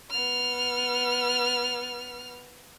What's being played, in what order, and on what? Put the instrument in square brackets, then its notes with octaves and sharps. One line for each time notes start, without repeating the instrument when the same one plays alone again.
[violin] B3 F6